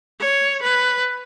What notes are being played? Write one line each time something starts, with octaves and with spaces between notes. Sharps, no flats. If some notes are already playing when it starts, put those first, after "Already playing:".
C#5
B4